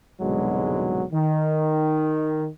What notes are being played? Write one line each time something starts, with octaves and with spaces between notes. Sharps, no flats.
C2 G#2 B2 D3 F#3 G#3
D#3